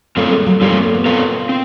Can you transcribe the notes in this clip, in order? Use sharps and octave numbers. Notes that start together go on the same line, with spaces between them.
A3 C4 F4 A#4 C#5 F5
G#3
F#3
G3 C4 F4 A#4 C#5 F5
A3
A#3
B3
C4 F4 A#4 C#5 F5
C4